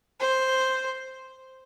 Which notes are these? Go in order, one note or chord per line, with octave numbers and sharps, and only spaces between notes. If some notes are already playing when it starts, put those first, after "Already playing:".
C5